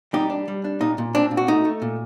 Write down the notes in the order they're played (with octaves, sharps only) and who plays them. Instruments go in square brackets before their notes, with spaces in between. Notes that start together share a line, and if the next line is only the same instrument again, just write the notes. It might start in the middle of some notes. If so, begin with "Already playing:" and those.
[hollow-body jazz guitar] G3 D#4 G4
D4
G3
D4
A#2 D#4
A#2
C4 D4
A#2
F#4
A3 D#4
A3
A#2